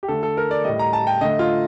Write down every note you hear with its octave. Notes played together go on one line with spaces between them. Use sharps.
G4
D3 A3 A4
A4
A#4
D5
A2 G3 D#5
A#5
A5
G5
D3 A3 D#5
F4